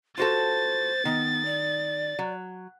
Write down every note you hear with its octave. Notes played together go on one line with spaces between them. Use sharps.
F4 F#4 A4 C5 A6
D#3 B3
D5
F#3